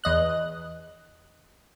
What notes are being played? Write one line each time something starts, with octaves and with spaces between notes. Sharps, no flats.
E2 D#5 F#6